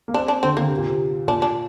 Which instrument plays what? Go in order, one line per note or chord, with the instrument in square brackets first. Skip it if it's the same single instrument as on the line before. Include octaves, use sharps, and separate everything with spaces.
[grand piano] A#3
[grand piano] C4 [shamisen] D4
[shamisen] D4
[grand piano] D3 [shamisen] C4
[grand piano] D3 [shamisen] A#3
[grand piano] C3
A#2
C3
[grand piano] A#2 [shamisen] D4
[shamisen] D4